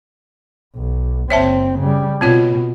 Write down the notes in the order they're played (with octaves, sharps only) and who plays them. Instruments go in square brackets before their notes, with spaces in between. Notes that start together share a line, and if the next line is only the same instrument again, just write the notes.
[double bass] B1
[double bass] F#1 C4 [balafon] C#5 E5 A5
[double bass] C#3 G3
[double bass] B2 [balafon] C4 F4 C#5